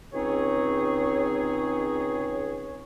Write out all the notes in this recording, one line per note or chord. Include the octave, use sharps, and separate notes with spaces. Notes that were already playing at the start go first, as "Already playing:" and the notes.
C#2 C4 D#4 G#4 C#5